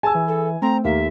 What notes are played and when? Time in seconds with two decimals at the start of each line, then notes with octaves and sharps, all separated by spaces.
0.03 G#4 G#5 A5 E6
0.15 E3
0.28 A4
0.62 A3 C4 A#5
0.84 D#2 A#3 E5